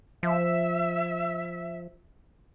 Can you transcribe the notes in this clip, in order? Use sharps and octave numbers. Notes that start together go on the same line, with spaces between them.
F3 E5